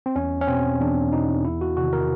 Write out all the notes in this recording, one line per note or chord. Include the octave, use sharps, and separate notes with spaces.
C4
E2 C#4
C#4
B2 C4
E2 D4
B2 D#4
E2 E4
F#4
C3 D#3 F#4
A#4